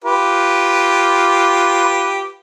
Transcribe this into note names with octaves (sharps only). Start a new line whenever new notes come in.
F4 G4 B4